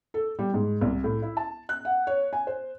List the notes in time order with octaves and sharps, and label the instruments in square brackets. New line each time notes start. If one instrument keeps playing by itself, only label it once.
[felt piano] A4
G3
G#2
C2
A2
E4
A5
F#6
F#5
C#5
G#5
C5